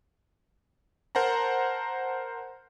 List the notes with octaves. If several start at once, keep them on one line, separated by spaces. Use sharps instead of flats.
A#4 C5 F#5 A5 A#5